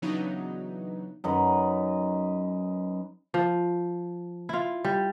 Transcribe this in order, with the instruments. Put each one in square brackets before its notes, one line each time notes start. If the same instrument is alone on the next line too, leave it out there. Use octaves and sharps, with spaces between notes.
[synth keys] C#3 E3 F#3 B3 D4 D#4
[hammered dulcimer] F#2 D#4 B4
[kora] F3
E4 F4
G3